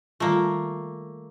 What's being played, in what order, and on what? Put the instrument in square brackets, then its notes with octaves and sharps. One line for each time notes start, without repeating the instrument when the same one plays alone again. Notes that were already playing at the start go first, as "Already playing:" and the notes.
[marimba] D#3 G3 F4 [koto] A3 A#3